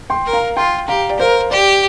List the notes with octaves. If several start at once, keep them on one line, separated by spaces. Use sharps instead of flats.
G5 C6
A#4
F5 A#5
F4 G5 C6
G4 F5 A#5
D5
A#4 C5 F5
G4 D5